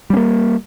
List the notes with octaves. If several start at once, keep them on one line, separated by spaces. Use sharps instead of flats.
G3 A#3 C#4